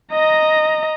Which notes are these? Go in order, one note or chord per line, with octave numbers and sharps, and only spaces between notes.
D#5 A#5